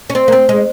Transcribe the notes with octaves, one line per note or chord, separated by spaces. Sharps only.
C#4
C4
A#3
C4
G#3